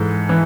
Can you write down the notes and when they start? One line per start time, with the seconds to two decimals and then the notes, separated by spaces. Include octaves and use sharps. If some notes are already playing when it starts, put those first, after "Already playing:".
Already playing: G#2 E3 A4
0.29 E3